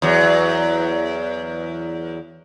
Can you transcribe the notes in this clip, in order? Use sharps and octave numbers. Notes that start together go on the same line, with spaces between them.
E2 F#3